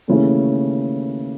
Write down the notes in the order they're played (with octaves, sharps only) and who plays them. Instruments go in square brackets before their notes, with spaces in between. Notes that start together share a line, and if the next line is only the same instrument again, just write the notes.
[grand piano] D#2 C#3 E3 A3 C#4